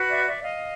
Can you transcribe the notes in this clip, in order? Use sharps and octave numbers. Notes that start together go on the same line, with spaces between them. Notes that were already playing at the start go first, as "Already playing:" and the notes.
Already playing: F#4 B4
D5 E5
D5 E5
D#5 F5